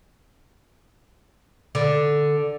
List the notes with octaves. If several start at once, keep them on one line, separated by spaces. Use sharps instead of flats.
D3